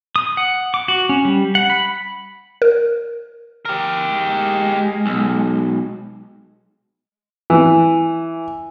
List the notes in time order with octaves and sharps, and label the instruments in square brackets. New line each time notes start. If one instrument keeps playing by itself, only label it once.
[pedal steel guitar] D#6
F#5
D6
F#4
C#4
G3
F#5
B5
[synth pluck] A#4
[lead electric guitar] G4 A#4
[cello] G#3
[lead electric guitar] B1
[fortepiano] E3